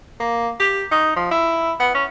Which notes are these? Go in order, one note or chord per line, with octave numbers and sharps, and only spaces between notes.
A#3
G4
D#4
F3
E4
B3
C#4